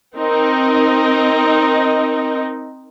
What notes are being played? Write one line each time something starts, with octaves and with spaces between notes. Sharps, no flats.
C4 D#4 A#4 D#5